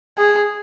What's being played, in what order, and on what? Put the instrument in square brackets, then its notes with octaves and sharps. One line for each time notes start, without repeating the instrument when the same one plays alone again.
[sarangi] G#4